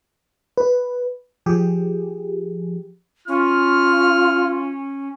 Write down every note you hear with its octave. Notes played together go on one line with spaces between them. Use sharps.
B4
F3 G4 G#4
C#4 F4 F6